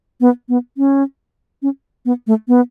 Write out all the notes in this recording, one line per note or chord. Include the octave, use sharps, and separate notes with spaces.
B3
B3
C#4
C#4
B3
A3
B3